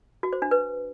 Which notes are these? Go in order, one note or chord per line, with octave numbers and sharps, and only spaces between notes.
F#4
C5
D4
B4